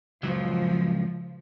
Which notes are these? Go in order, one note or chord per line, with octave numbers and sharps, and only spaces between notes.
C#2 F3 F#3